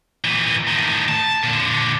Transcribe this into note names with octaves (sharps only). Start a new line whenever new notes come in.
A#2 E3
A2 D#3
A5
A#2 D3